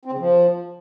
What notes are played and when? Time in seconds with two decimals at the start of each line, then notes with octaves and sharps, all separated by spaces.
0.05 C4
0.12 C#3
0.19 F3